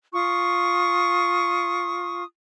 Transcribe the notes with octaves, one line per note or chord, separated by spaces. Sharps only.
F4 C#6 D#6